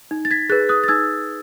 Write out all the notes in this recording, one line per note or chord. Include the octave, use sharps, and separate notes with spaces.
D#4
A6
G#6 B6
G#4 B4 F#6 A6
D#6 F#6
A6
D#4 E6 G#6